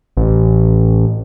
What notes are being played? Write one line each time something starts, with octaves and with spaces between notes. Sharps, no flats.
A1